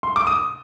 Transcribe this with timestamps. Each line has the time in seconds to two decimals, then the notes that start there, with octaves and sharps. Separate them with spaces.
0.03 C6
0.16 D6
0.27 D#6